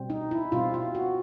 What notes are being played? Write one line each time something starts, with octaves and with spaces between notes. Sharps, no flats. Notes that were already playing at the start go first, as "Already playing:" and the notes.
Already playing: B2 G3 C4
D#4
E4
B2 G3 C4 F4
F4
F#4